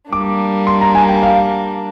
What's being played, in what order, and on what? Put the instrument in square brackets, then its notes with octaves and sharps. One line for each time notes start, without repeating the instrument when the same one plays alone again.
[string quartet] G3 A#3 D4 [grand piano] D6
[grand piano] C6
A#5
G#5
G5
F5